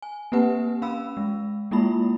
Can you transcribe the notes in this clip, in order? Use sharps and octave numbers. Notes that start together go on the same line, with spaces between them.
G#5
A#3 C4 G4 B4 F#5
C#4 F5 B5 E6
G#3
G#3 A#3 E4 F4 B5